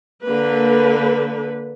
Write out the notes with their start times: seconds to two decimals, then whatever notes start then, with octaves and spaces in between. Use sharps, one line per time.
0.22 D3 A#3 B4